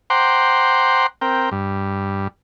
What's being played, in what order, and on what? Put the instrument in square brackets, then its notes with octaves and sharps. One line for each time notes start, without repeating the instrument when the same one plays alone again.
[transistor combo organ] C5 F#5 G5 A#5 C6 D6
C4 A#4 G5
G2